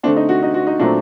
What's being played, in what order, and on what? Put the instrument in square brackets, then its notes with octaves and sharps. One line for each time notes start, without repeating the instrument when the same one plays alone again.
[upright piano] D3 A3 C4 D4
D#4
F#4
D#4
F#4
D#4
A#2 F#3 A3 C4 D4